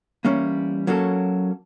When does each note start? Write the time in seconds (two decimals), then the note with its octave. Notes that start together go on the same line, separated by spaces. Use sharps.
0.25 E3 G3 A#3 C#4
0.87 F#3 A#3 C#4 F#4 A4